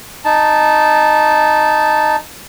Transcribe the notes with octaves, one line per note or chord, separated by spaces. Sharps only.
D#4 A5